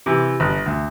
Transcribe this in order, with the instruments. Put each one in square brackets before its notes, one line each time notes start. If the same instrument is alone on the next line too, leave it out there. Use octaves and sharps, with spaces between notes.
[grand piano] C3 E3
G1
D2